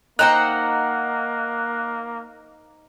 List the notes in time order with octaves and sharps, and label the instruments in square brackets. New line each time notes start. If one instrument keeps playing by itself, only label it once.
[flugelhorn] A#3 [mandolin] D#4 C5 F#5 [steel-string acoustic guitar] D#5 G5 A#5 [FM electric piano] F#6